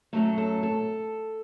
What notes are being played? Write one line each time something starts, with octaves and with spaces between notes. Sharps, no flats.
F#2 F#3 A3 A4
A4
A4